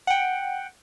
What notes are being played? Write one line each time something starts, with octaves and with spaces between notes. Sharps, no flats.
F#5 G5